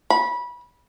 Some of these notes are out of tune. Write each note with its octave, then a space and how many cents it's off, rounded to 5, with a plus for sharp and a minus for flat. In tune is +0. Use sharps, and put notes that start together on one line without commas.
B5 -25